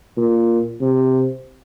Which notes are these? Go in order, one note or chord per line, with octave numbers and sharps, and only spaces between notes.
A#2
C3